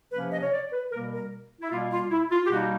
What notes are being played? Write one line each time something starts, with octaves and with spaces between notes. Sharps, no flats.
C3 F3 A#3 C#4 B4
D#5
C#5
D5
B4
B2 G3 A#3 A#4
A#4
E4
B2 G3 A#3 F4
F4
E4
F4
G4
B2 G3 A#3 D#4 F#4